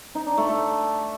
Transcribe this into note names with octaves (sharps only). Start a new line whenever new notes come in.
D#4
D4
A3
A3